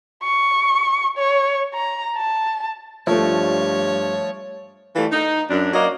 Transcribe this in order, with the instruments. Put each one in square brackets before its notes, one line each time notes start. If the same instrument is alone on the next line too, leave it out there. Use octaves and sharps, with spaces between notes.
[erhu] C#6
C#5
A#5
A5
[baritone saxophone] G2 [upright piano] F3 A3 [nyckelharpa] C#5
[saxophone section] E3 G3 A3 F4
D#4
F#2 D4
F#3 A#3 D5 D#5